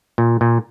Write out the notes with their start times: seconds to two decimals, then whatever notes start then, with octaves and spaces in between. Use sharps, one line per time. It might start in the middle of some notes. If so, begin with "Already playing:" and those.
0.18 A#2
0.41 A#2